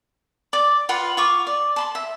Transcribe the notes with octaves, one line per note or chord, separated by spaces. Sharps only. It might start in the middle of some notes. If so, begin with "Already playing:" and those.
D5 D6
F4 B4 F#5 C6
F4 C#6 D6
D5
A5 B5 C6
E5